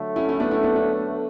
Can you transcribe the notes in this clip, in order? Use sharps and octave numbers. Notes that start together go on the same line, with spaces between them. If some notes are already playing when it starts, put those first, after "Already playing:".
Already playing: D3 F#3 A3
C#4 E4
C#4 E4
B3 D4
C#4 E4
B3 D4
B3 D4